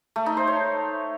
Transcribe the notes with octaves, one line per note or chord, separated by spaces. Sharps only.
A3
D#4
C5
C#5